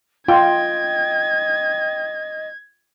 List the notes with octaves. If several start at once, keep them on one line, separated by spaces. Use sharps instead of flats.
F4 D#5 G5 G#6